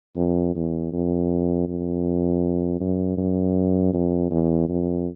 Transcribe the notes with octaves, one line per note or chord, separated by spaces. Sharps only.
F2
E2
F2
F2
F#2
F#2
F2
E2
F2